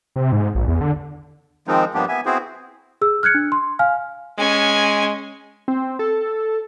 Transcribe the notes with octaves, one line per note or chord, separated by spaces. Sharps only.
C3
G#2
A#1
E2
D3
D#3 F3 G#3 C4 D#4
G2 F3 A#3 B3 D4 G4
B3 E5 G#5
B3 C4 E4 F#4 G#4 C5
G#4 E6
F6 F#6 G#6 C#7
D4
C6
F5 G#5 F6
G#3 C#4 G#5
C4
A4